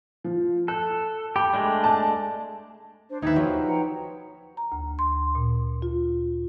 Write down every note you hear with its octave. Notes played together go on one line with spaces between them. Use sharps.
F3
A4 F#6
G4 B5
G#3 A3 D4
A5
D4 C5
D#2 D#4 G4 B4 E5 G#6
F3 F#3 C5
F#5 G5 A#5
A#5
D2
C6
A#2
F4